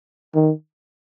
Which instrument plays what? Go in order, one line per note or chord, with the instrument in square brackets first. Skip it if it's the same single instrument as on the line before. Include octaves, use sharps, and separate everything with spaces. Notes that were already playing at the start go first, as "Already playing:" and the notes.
[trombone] D#3